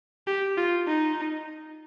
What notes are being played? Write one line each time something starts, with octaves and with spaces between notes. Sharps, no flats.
G4
F4
D#4